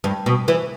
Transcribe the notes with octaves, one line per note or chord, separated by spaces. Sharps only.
G2
B2
E3